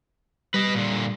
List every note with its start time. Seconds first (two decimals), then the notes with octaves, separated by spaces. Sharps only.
0.54 G3 B4 D#5
0.75 A#2 D3